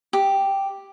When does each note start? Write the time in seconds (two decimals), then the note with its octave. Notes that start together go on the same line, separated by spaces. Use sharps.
0.13 G4